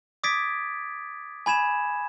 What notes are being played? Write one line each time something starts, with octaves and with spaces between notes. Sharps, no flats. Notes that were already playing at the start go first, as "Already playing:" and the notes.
D6 D#6 G#6 A6 B6 D7
G#5 B5 G#6 E7